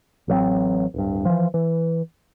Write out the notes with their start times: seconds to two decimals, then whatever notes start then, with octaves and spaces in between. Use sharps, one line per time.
0.28 A1 F#3 A#3 C4
0.94 D1 G2
1.25 E3 F3
1.54 E3